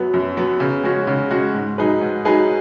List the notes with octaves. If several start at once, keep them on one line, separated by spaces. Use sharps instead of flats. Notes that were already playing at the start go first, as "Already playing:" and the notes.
Already playing: F#2 F#3 B3
F#2
F#3 B3
C#3
G#3 C#4 F#4
C#3
G#3 C#4 F#4
G#2
F#3 D#4 G#4 B4
G#2
F#3 D#4 G#4 B4